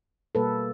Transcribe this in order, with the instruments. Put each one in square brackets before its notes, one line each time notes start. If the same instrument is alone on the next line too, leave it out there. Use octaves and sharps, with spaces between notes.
[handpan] B2 G3 A#3 A4 B4